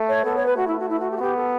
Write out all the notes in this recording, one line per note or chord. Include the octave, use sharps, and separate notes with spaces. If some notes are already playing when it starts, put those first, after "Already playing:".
Already playing: A3
C#5
B3 A4
C#5
B4
A3 F#4
E4
F#4
E4
F#4
G4
F#4
B3 G4
A4